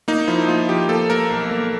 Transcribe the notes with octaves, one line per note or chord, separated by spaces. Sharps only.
A#3 D#4
F3 E4
A#3 F4
F3 G4
A#3 A4
A#3 A#4
B1
A#3